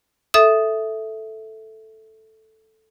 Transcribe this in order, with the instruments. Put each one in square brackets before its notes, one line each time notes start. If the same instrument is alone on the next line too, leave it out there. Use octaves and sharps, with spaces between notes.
[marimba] A4 E5 D#6